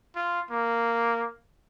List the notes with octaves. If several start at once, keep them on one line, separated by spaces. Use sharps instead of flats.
F4
A#3